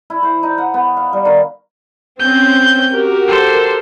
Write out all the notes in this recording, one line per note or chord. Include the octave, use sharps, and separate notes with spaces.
E4
C5
D#4
F#5
B3
F5
G3
D#3
C4 C#4 G6
F#4 G4 A#4
A4 C5